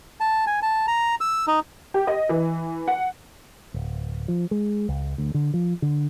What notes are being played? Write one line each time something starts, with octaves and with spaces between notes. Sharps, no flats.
A5
G#5
A5
A#5
E6
D#4
G4
D#5
E3
F#5
D1
F3
G#3
C#2
D2
D3
F3
D3